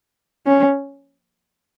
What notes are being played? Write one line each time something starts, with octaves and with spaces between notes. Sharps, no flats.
C#4